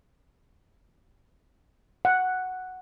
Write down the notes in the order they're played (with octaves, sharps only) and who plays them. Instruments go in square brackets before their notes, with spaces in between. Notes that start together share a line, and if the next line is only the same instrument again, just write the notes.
[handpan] F#5